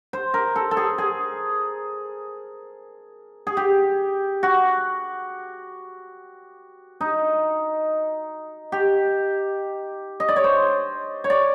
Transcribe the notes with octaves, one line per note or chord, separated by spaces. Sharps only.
C5
A#4
A4
A4
G#4
G#4
G#4
G4
F#4
D#4
G4
D#5
D5
C#5
C5
C#5
D5